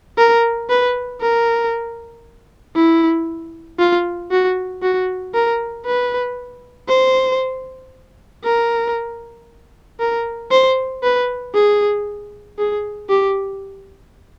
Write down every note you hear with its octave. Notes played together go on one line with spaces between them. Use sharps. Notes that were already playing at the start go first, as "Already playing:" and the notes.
A#4
B4
A#4
E4
F4
F#4
F#4
A#4
B4
C5
A#4
A#4
C5
B4
G#4
G#4
G4